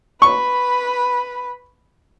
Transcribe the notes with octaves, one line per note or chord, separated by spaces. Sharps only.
B4 B5 C#6